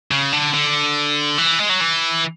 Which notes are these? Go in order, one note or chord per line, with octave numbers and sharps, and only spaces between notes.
C#3
D3
D3
E3
G#3
F#3
E3